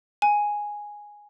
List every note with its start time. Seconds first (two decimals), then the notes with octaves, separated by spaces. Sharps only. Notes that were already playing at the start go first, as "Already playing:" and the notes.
0.22 G#5